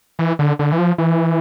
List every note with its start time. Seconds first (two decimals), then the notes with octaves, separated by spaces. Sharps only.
0.19 E3
0.39 D3
0.59 D3
0.72 E3
0.78 F3
0.98 E3